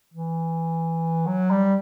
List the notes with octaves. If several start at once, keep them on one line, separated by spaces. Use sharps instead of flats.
E3
F#3
G3